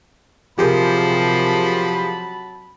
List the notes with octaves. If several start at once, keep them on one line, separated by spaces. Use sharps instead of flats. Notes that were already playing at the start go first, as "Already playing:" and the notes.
C3 F3 F#3 G4 G#4 A#4 A5 B5